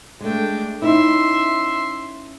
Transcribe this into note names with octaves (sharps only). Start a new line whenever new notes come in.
G#3 A3 D4 G5
C#4 D#4 E4 E5 C6